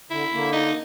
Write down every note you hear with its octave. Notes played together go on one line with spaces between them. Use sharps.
D3 E4
D3 A#3
D#4